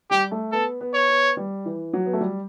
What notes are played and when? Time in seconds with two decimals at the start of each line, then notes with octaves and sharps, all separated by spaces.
0.11 G3 G4
0.31 A3
0.52 B3 A4
0.81 B3
0.94 C#5
1.09 B3
1.37 G3
1.65 E3
1.93 F#3
2.06 B3
2.13 A3
2.21 G3